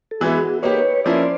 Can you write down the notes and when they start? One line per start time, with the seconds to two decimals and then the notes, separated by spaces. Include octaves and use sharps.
0.11 A4
0.21 E3 G#3 B3 E4 F#4 G#4
0.62 A#3 D#4 G4 B4 C#5
1.05 F3 A#3 C#4 E4 C5 D5